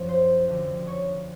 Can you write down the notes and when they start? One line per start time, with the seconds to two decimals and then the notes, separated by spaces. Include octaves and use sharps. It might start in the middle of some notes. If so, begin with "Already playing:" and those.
Already playing: F#2 F3
0.09 C5
0.48 F2 D3 F3
0.87 C#5